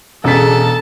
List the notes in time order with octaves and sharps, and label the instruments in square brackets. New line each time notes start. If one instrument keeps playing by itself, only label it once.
[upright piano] E1 C#3 B6 [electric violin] A4 A5